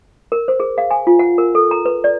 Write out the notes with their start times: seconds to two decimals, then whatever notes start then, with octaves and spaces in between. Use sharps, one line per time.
0.32 A#4
0.48 C5
0.60 G#4
0.78 F5
0.91 G#5
1.07 F4
1.19 F#5
1.38 A#4
1.55 A4
1.71 A#5
1.86 B4
2.04 D5